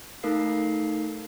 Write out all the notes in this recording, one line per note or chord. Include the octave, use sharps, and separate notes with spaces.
A3 D#4 A4 A#4 F5 C7